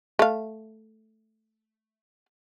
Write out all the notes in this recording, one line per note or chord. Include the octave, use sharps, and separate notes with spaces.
A3 F5